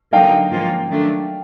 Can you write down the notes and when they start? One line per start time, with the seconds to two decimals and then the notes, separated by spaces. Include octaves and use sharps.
0.13 D3 F#3 A#3 D#4 F5 G5
0.51 G#2 F3 A#3 C#4 F4
0.89 D#3 F#3 A3 D4